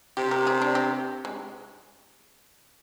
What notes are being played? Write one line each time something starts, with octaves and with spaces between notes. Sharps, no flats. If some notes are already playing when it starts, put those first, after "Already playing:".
C3 G4
A#4
G#4
D4
C4
G#3